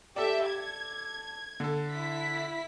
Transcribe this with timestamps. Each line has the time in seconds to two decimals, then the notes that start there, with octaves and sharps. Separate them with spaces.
0.16 G4 A4 D5 E5
0.47 G#6
1.60 D3 A4
1.92 E4 B6